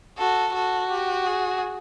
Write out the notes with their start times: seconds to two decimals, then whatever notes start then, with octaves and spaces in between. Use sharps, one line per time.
0.17 F#4 A4
0.54 F#4 A4
0.91 G4
1.27 G#4